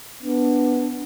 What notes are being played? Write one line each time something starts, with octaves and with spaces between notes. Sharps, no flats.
B3 D4